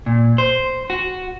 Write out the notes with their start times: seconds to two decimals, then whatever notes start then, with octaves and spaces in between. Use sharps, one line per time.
0.06 A#2
0.38 C5
0.90 F#4